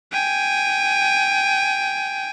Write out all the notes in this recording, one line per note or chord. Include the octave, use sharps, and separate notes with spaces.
G5 G#5